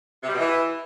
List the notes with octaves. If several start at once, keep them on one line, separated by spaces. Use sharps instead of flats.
C3
G3
B2
E3